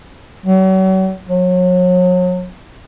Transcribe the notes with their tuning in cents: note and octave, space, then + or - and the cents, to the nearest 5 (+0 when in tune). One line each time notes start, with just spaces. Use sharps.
F#3 +40
F#3 -35